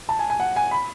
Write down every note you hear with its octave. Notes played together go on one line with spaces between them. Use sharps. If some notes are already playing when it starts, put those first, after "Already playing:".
A5
G#5
G#5
F#5
G#5
B5